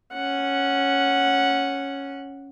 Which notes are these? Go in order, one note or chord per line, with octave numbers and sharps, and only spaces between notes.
C#4 F#5